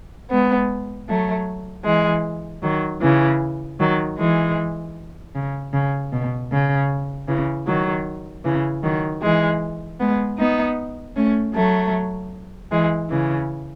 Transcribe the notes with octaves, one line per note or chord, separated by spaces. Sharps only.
G#3 B3
F#3 A3
E3 G#3
D#3 F#3
C#3 E3
D#3 F#3
E3 G#3
C#3
C#3
B2
C#3
C#3 E3
D#3 F#3
C#3 E3
D#3 F#3
E3 G#3
G#3 B3
B3 D#4
A3 C#4
F#3 A3
E3 G#3
C#3 E3